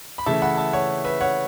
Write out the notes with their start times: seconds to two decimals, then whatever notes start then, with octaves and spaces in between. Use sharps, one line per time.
0.18 B5
0.26 C#3 E3 A3 E5 A5
0.42 F#5 B5
0.57 E5 A5
0.73 C#5 F#5
1.04 B4 E5
1.21 C#5 F#5